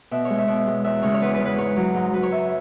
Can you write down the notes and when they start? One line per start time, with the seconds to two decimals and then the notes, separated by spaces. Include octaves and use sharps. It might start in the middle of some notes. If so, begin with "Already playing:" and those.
0.11 B2 E5
0.25 C#5
0.30 G#3
0.38 E5
0.48 B2
0.67 G#3
0.84 E2 E5
1.02 C#3 G#3 C#5
1.14 C#5
1.21 E2 B4
1.34 B4
1.40 C#3 G#3
1.45 B4
1.58 G#2 C#5
1.77 F#3
1.94 G#2
2.13 F#3 B4
2.23 C#5
2.31 F#2 E5